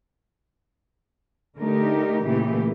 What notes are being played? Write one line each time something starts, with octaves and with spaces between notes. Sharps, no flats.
D3 A3 D#4 G4 A#4
A#2 C#3 E3 A3 G4